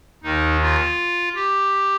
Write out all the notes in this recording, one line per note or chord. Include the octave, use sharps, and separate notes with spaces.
D#2 D#3 D#4
F4
G4